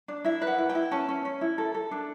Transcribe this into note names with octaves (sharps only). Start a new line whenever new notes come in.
D4
E4 E5
B4
F#5
E4
G5
E4
C#4 A5
C#4
C#4
E4
A4
A4
D4